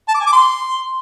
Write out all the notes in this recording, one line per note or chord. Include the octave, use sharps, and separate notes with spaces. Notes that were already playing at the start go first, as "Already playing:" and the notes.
A5
D6
G#5
D6
C6